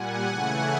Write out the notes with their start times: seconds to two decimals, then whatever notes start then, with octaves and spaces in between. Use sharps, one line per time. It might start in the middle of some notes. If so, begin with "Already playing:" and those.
Already playing: A#2 G3 F#5 G#5
0.24 C#3 E3 A3 F#5 G#5